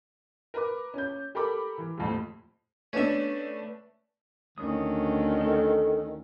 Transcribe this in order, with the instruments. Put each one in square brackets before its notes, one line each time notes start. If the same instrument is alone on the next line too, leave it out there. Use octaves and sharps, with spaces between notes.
[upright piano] A#4 B4 D6
C#4 G6
G4 A4 A#4 B5 D6
E3
D#1 F2 A2
[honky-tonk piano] A3 B3 D4 [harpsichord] C#4 E5
[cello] D2 C#4 [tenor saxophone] D#3 [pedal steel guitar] D#6
[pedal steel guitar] A4